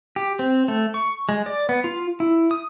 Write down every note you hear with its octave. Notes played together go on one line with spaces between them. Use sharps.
G4
C4
A3
C#6
G#3
D5
B3
F4
E4
D#6